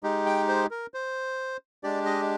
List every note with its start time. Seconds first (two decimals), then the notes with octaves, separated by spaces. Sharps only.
0.03 G#3 D#4 G4
0.26 G5
0.48 C5
0.71 A#4
0.94 C5
1.83 G#3 D4 G4 D5
2.06 D#5